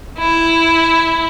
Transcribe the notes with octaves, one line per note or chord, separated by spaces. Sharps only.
E4